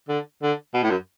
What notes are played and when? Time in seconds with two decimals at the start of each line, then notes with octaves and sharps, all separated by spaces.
0.09 D3
0.42 D3
0.74 B2
0.83 A2
0.91 F#2